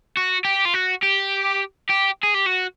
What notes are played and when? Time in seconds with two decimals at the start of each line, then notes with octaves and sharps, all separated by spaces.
0.17 F#4
0.45 G4
0.65 F4
0.74 F#4
1.02 G4
1.89 G4
2.23 G#4
2.34 G4
2.46 F#4